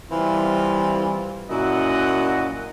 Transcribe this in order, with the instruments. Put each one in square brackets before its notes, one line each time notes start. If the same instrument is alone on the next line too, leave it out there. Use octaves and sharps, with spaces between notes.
[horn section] E3 G3 C4 E4 F4
F#2 A#2 F#3 E4 D#5 F#5